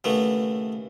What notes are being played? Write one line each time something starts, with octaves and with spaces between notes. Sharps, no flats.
D#2 C#3 E3 A3 B3